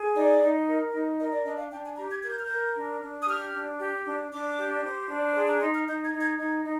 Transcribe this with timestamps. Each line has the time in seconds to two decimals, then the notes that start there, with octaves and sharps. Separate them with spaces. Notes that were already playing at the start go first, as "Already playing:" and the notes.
Already playing: G#4
0.14 D#4 D5
0.41 D#4
0.67 A#4
0.93 D#4
1.19 A#4 D#5
1.32 D5
1.45 D4 D#5
1.57 F5
1.70 D4 G5
1.84 G#5
1.96 G4 A#5
2.09 G#6
2.22 A#4 G#6
2.30 G6
2.38 F6
2.45 A#4 G6
2.75 D4
3.00 D4
3.22 D#6
3.27 G4 F6
3.53 D4
3.79 G4
4.05 D4
4.30 D4 D6
4.57 G4
4.83 C5
5.08 D4
5.34 G#4 C6
5.48 A#5
5.60 D#4 C6
5.73 F6
5.87 D#4 G6
6.04 G#6
6.13 D#4
6.21 G#6
6.38 D#4 G#6
6.64 D#4